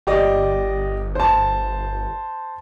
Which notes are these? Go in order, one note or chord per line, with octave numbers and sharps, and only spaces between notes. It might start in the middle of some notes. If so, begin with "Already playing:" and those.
G1 G4 D5 D#5
C5 A5